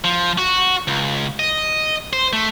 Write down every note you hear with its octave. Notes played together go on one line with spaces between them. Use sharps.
F3
F#4
C#2
D#5
C5
A3